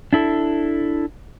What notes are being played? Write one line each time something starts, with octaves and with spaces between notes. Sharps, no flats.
D4 E4 A4